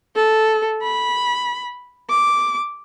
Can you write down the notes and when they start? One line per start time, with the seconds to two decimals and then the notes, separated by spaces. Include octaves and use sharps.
0.16 A4
0.83 B5
2.10 D6